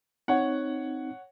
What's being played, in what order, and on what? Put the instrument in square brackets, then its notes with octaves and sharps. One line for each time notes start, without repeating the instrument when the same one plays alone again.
[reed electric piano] C4 D#4 [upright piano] C#5 F#5